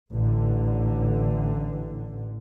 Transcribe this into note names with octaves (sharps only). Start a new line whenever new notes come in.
A1 D3